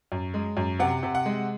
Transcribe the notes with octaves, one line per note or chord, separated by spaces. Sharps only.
F#2
G#3
F#2
C3 F#5
C3
F#5
G#3